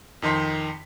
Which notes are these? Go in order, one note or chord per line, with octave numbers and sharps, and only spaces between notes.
F2 D#3 D#4 C6 B6